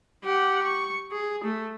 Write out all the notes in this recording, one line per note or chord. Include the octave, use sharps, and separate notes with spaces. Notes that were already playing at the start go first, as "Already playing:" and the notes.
G4 F#5
C#6
G#4
A3